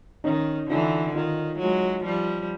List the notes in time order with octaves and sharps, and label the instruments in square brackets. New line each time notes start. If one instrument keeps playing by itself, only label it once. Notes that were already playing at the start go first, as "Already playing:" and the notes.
[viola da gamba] D#3 [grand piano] C#4 D#4
[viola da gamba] D3 E3 [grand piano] D#4 F4
[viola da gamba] D#3 [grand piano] D#4 F4
[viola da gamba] F#3 G#3
F3 G3